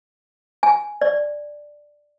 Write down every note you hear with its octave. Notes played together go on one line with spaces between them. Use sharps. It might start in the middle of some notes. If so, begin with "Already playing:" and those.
G#5
D5